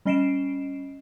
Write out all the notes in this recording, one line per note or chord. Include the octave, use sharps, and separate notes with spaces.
G3 C#4 D#5 C7 D7 E7